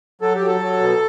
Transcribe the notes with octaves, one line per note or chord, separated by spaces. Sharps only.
F#3 A4
G4
F#3
A4
F#3
B2